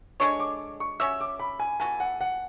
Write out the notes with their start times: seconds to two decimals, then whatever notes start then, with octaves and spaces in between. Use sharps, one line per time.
0.20 G#3 D4 A4 C#5 C#6
0.40 D6
0.80 C#6
1.00 C#4 F#4 C#5 E5 E6
1.20 D6
1.39 B5
1.60 G#5
1.80 E3 B3 F#4 A4 G#5
2.00 F#5
2.21 F#5